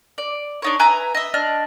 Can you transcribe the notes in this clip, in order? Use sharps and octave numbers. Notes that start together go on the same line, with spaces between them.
D5
D4 D#4 C#5
B4 E5 G#5 A#5
D#5 E5
D4 D#5 F6